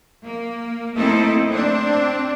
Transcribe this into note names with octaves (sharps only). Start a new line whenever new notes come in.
A#3
A3 A#3 C4 D#4 E4 A4
C4 D4